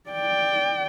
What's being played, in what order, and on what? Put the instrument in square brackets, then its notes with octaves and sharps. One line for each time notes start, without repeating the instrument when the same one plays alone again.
[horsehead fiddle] D5 G5